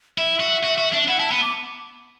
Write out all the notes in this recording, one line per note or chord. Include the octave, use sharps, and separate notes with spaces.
E4 E5
F#4
F#4
F#4
D4
E4 F#5
E4 A5
B3 B5
D6